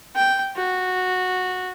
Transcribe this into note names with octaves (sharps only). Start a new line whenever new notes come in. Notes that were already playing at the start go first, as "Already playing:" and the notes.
G5
F#4